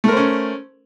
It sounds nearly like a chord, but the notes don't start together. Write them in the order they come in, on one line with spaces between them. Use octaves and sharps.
A3 A#4 C5 C#4